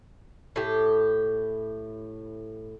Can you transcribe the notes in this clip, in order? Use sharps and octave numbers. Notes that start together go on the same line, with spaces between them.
A2 G4